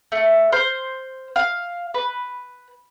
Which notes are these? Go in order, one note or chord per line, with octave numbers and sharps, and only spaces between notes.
A3
C5 F6
F5
B4